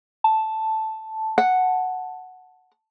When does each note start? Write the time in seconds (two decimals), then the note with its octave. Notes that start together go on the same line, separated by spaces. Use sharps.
0.24 A5
1.38 F#5